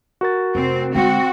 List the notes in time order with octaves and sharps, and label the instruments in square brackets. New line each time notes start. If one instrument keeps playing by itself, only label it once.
[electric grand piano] F#4 A#4 A6
[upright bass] F1 [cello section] C4
[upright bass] D3 G#3 [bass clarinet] C4 [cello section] F#4